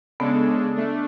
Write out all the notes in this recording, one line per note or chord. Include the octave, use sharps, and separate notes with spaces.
C#3 G#3 B3 D4 A4
A3 D4